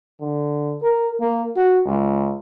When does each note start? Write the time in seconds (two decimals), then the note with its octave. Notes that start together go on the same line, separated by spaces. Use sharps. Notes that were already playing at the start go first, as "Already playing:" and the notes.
0.20 D3
0.82 A#4
1.20 A#3
1.56 F#4
1.86 C#2